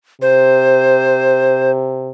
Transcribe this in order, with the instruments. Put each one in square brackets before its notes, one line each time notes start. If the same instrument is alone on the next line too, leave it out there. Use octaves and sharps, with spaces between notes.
[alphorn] C3 [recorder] C5